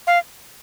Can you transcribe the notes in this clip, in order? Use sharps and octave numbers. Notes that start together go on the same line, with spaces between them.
F5